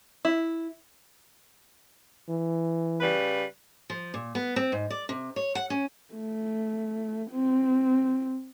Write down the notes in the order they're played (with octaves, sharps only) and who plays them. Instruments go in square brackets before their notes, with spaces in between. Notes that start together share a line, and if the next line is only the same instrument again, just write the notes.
[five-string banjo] E4
[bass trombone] E3
[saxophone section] C#3 G3 B4
[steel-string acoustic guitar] F3
A#2
B3
C4
G#2
D5
C3
C#5
F#5
C#4
[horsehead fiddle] A3
C4